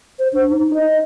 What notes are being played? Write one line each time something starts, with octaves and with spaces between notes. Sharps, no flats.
C5
D4
D#4
D#5